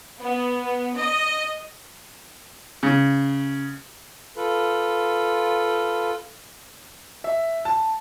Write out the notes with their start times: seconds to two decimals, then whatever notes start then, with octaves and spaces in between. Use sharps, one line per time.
0.21 B3
0.97 D#5
2.83 C#3
4.36 F4 A4 B4
7.24 E5
7.65 A5